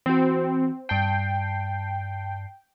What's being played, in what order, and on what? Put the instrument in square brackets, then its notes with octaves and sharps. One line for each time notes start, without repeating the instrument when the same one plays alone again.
[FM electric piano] E3 F#4 [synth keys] C4
[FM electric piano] G2 A5 C7 [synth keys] G5